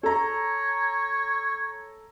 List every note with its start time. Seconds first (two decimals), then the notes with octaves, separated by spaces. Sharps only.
0.03 A4 C#5 A#5